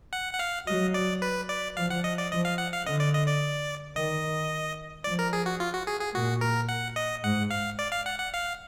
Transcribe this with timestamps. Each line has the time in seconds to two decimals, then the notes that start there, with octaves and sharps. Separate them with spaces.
0.13 F#5
0.33 F#5
0.39 F5
0.67 F#3 D#5
0.94 D5
1.22 B4
1.49 D5
1.76 F3 F5
1.90 F#5
2.04 D#5
2.18 D5
2.32 F3 D#5
2.45 F5
2.58 F#5
2.73 F5
2.86 D3 D#5
3.00 D5
3.13 D#5
3.27 D5
3.96 D#3 D#5
5.04 F3 D5
5.19 A#4
5.33 G#4
5.46 F#4
5.60 F4
5.73 F#4
5.87 G#4
6.00 G#4
6.14 A#2 F#4
6.41 A#4
6.69 F#5
6.96 D#5
7.23 G#2 F#5
7.50 F5
7.79 D5
7.92 F5
8.06 F#5
8.19 F#5
8.34 F5